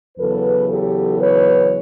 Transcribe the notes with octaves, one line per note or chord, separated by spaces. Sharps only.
E2 C#3 F#3 A4 B4
G4 A4
B4 C#5